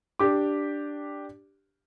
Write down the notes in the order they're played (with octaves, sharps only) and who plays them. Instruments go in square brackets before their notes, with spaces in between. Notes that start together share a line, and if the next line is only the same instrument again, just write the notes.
[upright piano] D4 G4 D6